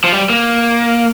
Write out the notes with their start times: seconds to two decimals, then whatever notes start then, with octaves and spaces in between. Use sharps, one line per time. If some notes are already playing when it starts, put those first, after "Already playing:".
0.04 F3
0.12 G3
0.30 A#3